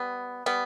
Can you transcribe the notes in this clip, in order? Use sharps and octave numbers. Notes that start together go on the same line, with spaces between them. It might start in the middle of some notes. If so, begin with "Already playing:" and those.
Already playing: G3 B3
G3 B3